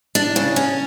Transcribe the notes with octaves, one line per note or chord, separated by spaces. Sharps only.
D4
C#3
C#4